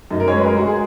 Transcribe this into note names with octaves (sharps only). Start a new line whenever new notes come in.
F#2 D#4
A#4
G#3 C#5
B4
G#3 A#4
F#4
G#3
G#4